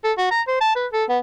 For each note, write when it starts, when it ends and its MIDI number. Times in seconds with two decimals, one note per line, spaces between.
0.04 0.12 69
0.18 0.27 66
0.31 0.41 82
0.48 0.57 72
0.61 0.76 81
0.76 0.87 71
0.92 1.04 69
1.09 1.19 59